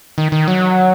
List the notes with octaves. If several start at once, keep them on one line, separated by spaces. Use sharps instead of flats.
D#3
D#3
F#3